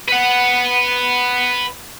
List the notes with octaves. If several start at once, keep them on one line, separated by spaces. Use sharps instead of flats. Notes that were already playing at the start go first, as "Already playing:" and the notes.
B4 F#5